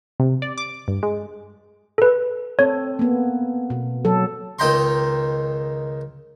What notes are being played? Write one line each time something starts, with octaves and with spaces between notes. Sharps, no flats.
C3
D5
D6
G2
G#3
A4 B4
C4 A4 C#5
A#3 B3
B2
F#3 A4
C#2 D#3 D#5 G5 A#5 C6